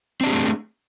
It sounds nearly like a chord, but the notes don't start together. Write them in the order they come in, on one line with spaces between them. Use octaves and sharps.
C4 D4 G4 G#4 A3